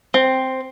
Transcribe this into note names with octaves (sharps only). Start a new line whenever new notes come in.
C4